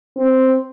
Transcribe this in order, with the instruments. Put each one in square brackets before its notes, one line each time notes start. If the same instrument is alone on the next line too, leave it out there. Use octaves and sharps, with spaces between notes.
[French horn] C4